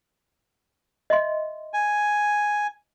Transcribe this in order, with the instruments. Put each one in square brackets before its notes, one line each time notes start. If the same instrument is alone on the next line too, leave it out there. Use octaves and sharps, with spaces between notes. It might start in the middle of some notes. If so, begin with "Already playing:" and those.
[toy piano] D#5 E5 C6
[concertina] G#5